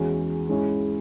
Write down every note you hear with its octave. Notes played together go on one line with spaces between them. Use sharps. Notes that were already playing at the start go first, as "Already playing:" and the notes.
Already playing: E2 E3 G#3 C#4 F#4
G#2 G#3 C#4 E4